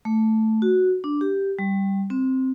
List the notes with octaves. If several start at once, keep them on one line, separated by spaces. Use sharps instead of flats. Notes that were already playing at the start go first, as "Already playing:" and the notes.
A3
F#4
D4
G4
G3
C4